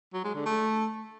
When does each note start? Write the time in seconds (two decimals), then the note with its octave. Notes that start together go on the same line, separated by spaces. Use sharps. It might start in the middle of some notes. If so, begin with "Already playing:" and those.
0.14 F#3
0.24 G#3
0.35 D3
0.46 A3